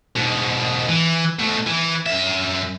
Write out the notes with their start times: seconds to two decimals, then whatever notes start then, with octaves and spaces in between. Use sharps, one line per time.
0.16 G#2 B2
0.88 E3
1.39 B2 A3
1.67 E3
2.06 F#2 E5